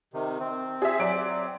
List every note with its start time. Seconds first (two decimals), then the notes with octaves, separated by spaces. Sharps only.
0.14 C3 D#3
0.40 C4
0.82 G#4 E5
0.99 F#3 D5 D7